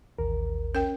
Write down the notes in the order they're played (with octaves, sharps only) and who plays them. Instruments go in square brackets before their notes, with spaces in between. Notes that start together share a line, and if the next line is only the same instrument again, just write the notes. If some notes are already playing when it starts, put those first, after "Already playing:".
[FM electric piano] A1 D#2 [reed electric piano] A#4
[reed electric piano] C#4 [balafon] A#4 G5